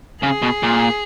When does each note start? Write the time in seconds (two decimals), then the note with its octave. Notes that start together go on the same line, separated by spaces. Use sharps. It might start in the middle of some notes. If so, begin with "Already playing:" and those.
0.23 C#3 G#4
0.42 B2
0.63 A#2